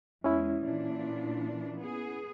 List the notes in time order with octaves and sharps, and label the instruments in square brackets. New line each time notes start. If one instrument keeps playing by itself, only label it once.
[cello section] E2 G#3 [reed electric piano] C#4 E4
[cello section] A#2 E3 D4
B3 G#4